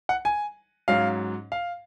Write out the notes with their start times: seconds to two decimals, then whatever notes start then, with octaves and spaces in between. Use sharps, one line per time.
0.09 F#5
0.25 G#5
0.88 G#2 F#3 C#4 F5
1.52 F5